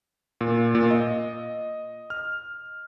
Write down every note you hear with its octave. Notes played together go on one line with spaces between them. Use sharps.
A#2
A#2
D#5
F6